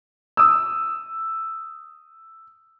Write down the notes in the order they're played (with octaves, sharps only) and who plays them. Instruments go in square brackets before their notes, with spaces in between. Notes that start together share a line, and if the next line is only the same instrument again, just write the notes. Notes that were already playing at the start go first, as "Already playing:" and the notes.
[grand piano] D#6 E6